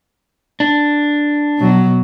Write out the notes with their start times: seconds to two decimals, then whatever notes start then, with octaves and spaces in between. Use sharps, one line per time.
0.60 D4
1.58 B2 F#3